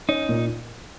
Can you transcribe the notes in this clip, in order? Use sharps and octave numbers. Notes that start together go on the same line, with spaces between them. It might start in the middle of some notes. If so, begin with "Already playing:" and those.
C#4 D#4
A#2